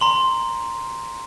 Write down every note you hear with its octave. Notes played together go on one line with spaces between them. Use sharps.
A#5 C6 F#7